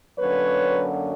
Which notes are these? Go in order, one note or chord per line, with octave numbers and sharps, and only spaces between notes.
F#2 D3 F#3 A#3 C#4 B4 C#5